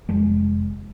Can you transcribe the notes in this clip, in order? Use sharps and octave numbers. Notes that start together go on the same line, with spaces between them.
F1 G#3